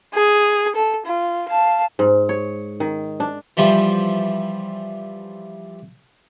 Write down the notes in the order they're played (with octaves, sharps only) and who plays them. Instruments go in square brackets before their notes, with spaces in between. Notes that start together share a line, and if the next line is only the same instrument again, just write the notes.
[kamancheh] G#4
A4
F4
F5 A5
[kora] G#2
C#5
D#3
D4
[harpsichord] E3 F3 G3 F4